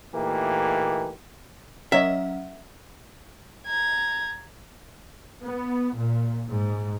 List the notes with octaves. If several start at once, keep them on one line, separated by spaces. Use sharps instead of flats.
A#2 E3 A3 A#3 D#4 G4
F#3 C#4 A#4 C#5 D#5 E5 F#5
A#5 G#6
B3
A#2
G#2